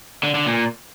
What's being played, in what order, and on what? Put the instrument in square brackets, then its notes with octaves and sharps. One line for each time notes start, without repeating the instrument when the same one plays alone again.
[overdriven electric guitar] D3
D3
A#2